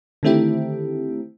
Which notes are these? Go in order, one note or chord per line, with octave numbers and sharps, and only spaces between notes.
D3 D#3 A3 C4 E4 G4